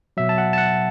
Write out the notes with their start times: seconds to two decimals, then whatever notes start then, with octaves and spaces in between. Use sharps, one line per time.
0.17 B2 F#3 E5
0.29 A5
0.38 F#5
0.53 A5
0.58 F#5